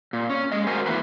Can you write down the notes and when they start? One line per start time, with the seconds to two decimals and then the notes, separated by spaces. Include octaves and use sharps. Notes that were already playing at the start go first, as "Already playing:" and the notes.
0.13 A#2
0.30 C#4
0.52 G#3 D#5
0.67 F#4 A#4 C5 G#5
0.86 E3 A#3 B4